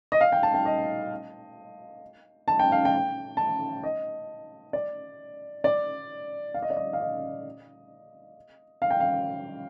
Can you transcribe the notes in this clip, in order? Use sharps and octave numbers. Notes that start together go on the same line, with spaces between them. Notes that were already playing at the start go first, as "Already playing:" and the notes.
D#5
F5
G5
A5
G5
D#5
A5
G5
F5
G5
A5
D#5
D5
D5
F5
D#5
D5
D#5
F5
D#5
F5
G5
F5